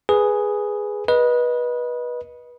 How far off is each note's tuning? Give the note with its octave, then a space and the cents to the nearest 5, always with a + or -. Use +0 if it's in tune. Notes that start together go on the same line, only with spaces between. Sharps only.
G#4 +0 B4 +0
B4 -20 D#5 +0